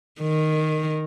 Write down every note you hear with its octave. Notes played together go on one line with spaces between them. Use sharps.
D#3